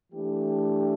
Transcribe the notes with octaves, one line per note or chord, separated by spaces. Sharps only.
E3 A3 D4 G4